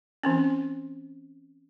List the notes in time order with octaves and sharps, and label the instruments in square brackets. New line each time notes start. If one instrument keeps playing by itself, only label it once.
[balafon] E3 C4 C#4